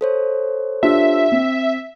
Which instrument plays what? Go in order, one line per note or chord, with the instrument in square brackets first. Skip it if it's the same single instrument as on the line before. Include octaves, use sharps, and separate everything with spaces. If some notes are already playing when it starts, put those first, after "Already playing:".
[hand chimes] A4 C5 C#5
[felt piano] D4 F4 G4 [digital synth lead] E5
[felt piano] C4